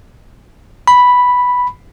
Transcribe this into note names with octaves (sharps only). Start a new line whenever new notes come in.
B5